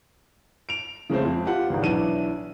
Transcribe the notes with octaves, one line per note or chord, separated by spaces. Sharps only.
D7 F7
C#3 G#3 A3 C4
F2
F4 G4 F#5
G#1 C#2
B1 E3 D4 D#7